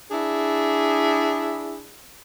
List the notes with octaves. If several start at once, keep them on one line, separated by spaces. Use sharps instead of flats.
D4 E4 G#4